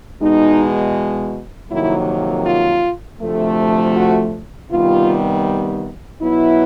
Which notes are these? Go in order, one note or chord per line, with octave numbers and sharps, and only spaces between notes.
E2 B2 G#3 D#4
F2 C3 D#3 F#3 A#3 E4
F4
D2 C3 F3 A3
F#4
C3 D#3 G3 B3 F4
B2 F#3 B3 E4